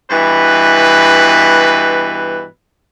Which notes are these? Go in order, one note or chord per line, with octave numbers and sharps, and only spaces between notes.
G2 B2 E3 B4